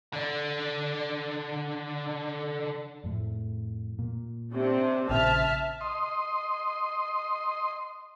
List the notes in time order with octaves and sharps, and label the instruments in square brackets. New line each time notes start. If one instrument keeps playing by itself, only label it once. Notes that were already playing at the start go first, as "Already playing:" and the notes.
[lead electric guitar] D3 D4
[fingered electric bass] F2 A2
A#2
[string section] C3 C4 D4
[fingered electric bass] A#1 A#2 C#3 [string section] E5 A5 F6
[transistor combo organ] D#5 C6